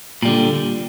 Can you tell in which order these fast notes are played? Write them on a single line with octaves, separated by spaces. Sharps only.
A#2 G3 D3